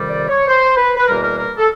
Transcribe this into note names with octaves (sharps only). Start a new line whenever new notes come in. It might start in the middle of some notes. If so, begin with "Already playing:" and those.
Already playing: F2 C3 D#3 G3
D5
C#5
C5
B4
B4
E2 B2 G3 A#3 A#4
A#4
A#4
A4